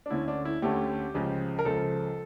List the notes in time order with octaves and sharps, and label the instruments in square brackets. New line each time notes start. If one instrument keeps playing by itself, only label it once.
[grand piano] D4
D2 D3 A3 C#4 E4
D4
E4
D2 D3 A3 C#4 G4
C#2 C#3 F3
A#4
C#2 C#3 F3 A4